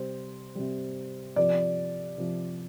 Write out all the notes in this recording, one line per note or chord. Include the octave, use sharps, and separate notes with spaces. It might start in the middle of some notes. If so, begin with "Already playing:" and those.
Already playing: C3 G3 C5
C3 G3
C3 F3 D5
C3 F3